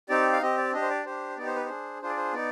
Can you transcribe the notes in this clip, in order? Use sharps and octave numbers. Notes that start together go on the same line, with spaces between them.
C4 D#4 G4 D5
F5
C4 G4 D#5
D5
D4 G4 D#5
C5
D5
D4 G4 C5
B3 D#4 G4 D5
C5
B4
D4 G#4 C5
D4 F4 G#4 C5
D5
C5
B3 D#4 D5